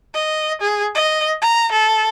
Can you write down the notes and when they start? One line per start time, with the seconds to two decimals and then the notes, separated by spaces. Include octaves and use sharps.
0.15 D#5
0.61 G#4
0.95 D#5
1.42 A#5
1.72 A4